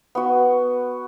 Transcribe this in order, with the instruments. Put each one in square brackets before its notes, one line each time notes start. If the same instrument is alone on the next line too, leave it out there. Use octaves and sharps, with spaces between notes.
[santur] B3 F#4